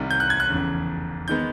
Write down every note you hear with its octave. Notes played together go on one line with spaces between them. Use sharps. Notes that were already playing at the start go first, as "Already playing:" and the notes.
Already playing: C2 C3 D#3 G3
G6
F#6
G#6
F#6
F1 E2 C#3
D#3 G#3 B3 G6